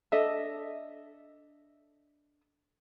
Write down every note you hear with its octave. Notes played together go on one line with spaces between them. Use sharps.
D4 A4 D#5 E5